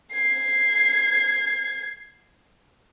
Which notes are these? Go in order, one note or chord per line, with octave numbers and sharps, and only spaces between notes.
G#6 C7